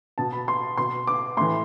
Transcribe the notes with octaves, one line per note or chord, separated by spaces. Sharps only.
B2 A5
B5
C6
B2 C6
D6
A2 E3 C6